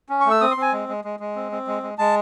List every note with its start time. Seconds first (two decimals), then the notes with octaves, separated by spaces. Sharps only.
0.09 C#4
0.20 C#6
0.26 A3
0.31 E6
0.41 C4 D#6
0.51 C6
0.57 C4 G#5
0.72 G#3
0.89 G#3
1.04 G#3
1.20 G#3
1.36 C4
1.52 C4
1.67 G#3
1.83 G#3
1.98 G#3 A5